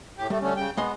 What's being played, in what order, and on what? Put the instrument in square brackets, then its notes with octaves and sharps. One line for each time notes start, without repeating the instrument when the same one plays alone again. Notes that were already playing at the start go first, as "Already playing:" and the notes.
[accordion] A2 G4
[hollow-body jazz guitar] G3 [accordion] A3
[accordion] D3 A3 C#4
C#3 G5
[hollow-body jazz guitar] G#3 D#5 C6 [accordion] B3